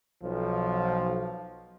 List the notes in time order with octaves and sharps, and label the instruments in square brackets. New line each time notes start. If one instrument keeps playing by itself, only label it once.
[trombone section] B1 F3